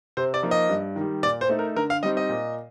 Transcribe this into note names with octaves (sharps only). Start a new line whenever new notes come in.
C3 C5
D5
F3 A#3 D#4
D#5
G2
D#3
G3
A#2 D5
C5
A3 D#4
A#4
D3 A#4
F5
G3 C4 D#4 D#5
D#5
A#2